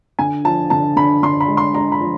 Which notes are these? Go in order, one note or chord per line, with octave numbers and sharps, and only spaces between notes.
D3 G#5
F3 A5
D3 A5
D3 B5
D3 C6
B5
G#3
C6
G#3 A#5
B5
F3